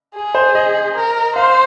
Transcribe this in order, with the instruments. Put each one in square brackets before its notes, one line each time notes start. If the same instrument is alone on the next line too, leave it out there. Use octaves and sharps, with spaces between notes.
[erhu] G#4
[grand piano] C5
D#5
[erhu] A#4
[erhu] C5 [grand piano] F5